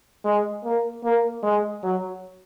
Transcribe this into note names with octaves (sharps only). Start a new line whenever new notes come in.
G#3
A#3
A#3
G#3
F#3